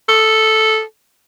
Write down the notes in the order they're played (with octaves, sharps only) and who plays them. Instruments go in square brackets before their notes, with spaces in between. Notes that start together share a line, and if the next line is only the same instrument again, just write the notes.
[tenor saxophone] A4